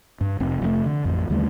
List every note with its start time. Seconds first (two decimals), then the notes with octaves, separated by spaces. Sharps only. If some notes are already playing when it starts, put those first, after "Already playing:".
0.21 G2
0.40 F1 C4
0.62 F1 A2 A3
0.86 D3
1.04 A1 F2
1.30 D#2 D3 G3 A3